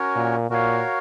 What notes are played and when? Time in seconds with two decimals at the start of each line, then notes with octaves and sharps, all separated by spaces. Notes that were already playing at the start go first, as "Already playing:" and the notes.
Already playing: C#4 F#4 A#4 C#5
0.16 A#2
0.50 A#2 F#4 A#4 C#5 F5